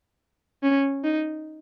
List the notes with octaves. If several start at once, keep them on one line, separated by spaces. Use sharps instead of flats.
C#4
D#4